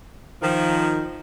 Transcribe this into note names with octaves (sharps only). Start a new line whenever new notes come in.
D#3 F3